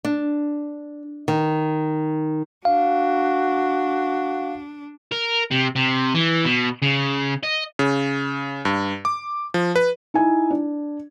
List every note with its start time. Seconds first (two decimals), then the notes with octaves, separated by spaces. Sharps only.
0.05 D4
1.28 D#3
2.65 D4 F#4 F5
5.12 A#4
5.51 C3
5.76 C3
6.15 E3
6.45 B2
6.82 C#3
7.43 D#5
7.79 C#3
8.65 G2
9.05 D6
9.54 F3
9.76 B4
10.14 D#4 E4 G#5
10.50 D4